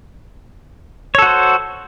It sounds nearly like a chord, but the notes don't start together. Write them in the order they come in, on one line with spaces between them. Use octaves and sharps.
C#5 A4 F#4 C5